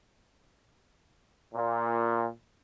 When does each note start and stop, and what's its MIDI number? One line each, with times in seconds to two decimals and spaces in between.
1.54 2.27 46